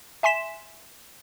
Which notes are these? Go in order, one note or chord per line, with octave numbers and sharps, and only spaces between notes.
E5 G#5 C6 B6 E7